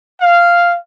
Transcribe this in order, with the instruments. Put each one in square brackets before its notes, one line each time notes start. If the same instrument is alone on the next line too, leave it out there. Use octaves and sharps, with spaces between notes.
[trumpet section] F5